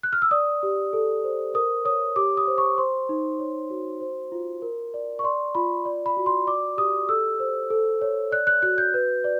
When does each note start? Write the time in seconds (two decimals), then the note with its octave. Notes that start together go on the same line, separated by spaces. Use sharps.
0.03 F#6
0.13 F6
0.22 E6
0.31 D5 D#6
0.63 G4
0.93 A4
1.24 C5
1.54 A#4 D#6
1.85 C#5 D#6
2.16 G4 D6
2.37 D#6
2.47 C5
2.58 C#6
2.78 C5 C6
3.09 D#4
3.39 C#5
3.70 F#4
4.01 C5
4.32 F4
4.62 A#4
4.94 D5
5.19 C#6
5.24 D5 C6
5.55 F4 B5
5.85 D5
6.06 B5
6.17 F#4
6.26 C6
6.47 D5 D6
6.77 G4 D#6
7.09 A4 E6
7.40 C5
7.70 A4
8.02 C#5
8.32 D5 F#6
8.47 F#6
8.62 F#4 F#6
8.78 G6
8.94 B4
9.24 D5